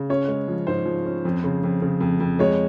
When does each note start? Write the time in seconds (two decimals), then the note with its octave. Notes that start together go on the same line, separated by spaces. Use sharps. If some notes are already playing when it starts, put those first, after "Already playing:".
Already playing: C#3
0.10 C#4 C#5
0.28 G#3
0.48 F3
0.67 G#2 C5
0.86 F3
1.05 C#4
1.25 F2
1.44 C#3
1.63 F2
1.82 C#3
2.01 F2
2.20 F2
2.39 G#3 C#5